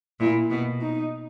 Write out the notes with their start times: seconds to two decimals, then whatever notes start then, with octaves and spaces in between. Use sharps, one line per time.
0.20 A#2 E4
0.50 B2 B3
0.81 D#4